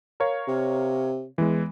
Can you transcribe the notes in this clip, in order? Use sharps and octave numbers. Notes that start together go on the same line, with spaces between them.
A#4 C#5 F5
C3
E2 E3 G#3